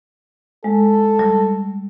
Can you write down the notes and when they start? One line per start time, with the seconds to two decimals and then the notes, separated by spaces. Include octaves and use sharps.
0.64 G#3 A4
1.19 G3